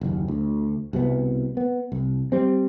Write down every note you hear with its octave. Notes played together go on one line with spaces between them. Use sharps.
F#1 D#2
D2
C2 B2 G3 B3
B3
C2
G3 C4